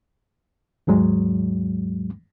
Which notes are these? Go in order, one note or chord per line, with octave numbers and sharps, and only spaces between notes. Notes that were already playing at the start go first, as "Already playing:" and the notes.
D#2 G#2 F#3 G#3